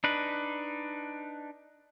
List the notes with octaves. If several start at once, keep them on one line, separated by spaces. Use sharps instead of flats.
D4 D#4 B4